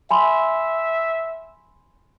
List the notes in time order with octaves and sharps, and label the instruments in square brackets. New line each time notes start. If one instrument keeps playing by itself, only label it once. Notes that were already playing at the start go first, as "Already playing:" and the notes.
[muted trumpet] E5 [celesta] G#5 B5 C6